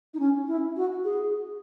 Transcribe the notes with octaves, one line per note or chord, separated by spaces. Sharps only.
D#4
C#4
E4
F#4
G#4